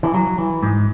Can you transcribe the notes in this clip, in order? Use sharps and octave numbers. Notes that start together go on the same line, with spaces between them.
E3
F#3
E3
G#2